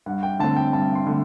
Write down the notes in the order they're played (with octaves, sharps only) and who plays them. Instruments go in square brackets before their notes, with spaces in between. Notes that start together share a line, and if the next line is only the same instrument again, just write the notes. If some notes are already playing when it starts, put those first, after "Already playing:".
[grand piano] G2 F#5
G5
D3 A3 C4 A5
G5
G2 A5
C6
D3 A3